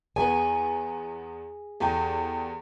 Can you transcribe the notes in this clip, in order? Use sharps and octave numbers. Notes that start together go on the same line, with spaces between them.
E2 B3 G#4 G#5
E2 G4 A4 G5